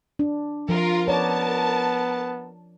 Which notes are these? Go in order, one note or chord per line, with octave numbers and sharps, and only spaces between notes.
D4
F3 F4 A#4
B3 A#4 C#5 D5 A5